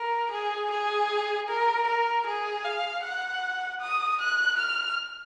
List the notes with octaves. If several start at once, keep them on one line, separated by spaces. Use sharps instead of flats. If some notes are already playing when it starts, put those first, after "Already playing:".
Already playing: A#4
G#4
G#4
A#4
A#4
G#4
F5
F#5
D#6
F#6
F6